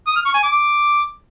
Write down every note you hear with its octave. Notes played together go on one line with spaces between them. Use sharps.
D#6
F6
C#6
G#5
D6